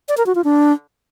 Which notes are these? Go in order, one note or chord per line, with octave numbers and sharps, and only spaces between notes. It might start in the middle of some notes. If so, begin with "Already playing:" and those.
D5
A#4
F#4
F4
D4